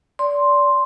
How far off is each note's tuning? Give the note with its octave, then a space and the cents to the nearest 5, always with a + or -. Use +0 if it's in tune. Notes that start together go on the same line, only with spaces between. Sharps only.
D5 -25 C6 +0